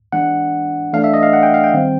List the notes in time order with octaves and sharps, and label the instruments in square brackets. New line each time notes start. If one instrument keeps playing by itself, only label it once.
[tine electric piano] E3 G#3 B3 D4 F#5
E3 A3 D4 F5
E5
D#5
F5
F#5
G5
F5
G5
D#3 G3 C4